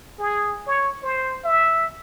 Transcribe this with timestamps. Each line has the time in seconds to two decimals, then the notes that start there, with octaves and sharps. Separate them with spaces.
0.19 G#4
0.67 C#5
1.03 C5
1.44 E5